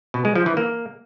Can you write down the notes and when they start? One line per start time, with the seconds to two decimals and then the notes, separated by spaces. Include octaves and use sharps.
0.14 B2
0.25 G#3
0.35 F3
0.46 E3
0.57 A#3